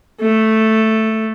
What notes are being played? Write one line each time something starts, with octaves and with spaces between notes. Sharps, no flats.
A3